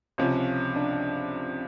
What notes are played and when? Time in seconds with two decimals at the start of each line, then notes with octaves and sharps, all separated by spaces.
0.18 C#2 C3 F3 C#4
0.76 D4